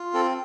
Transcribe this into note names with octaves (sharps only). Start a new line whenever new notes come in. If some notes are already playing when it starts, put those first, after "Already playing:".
Already playing: F4
C4 A4